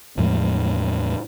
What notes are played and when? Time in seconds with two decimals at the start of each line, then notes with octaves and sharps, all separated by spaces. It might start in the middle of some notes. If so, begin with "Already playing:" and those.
0.18 E2 A2 F3 G#3